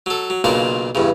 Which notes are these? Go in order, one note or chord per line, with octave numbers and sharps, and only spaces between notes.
F#3 A4
F#3
B1 A#2 C#3 A#3 D4 A#4
E2 G2 C#3